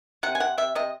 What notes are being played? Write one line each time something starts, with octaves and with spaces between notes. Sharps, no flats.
C3 F#5
G#5
C3 F#5
C3 E5
C3 D#5